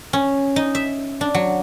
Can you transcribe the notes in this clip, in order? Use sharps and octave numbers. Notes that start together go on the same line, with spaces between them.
C#4
D#4
E5
D4
F#3